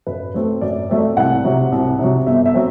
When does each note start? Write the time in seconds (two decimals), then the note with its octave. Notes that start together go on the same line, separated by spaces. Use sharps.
0.07 F#2 B4
0.34 F#3 A3 C4 C5
0.61 F#2 D5
0.89 F#3 A3 C4 E5
0.99 D5
1.17 C2 F#5
1.44 C3 F#3
1.72 C2
1.99 C3 F#3
2.27 G1 E5
2.46 E5
2.54 F#3 C4